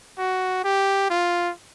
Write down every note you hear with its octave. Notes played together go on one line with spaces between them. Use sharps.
F#4
G4
F4